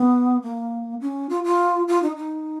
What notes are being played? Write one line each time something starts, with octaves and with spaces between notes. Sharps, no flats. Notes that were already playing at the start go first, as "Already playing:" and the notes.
Already playing: B3
A#3
C#4
F4
F4
F4
D#4
D#4